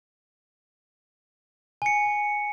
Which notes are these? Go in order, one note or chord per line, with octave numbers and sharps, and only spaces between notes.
G#5 C#7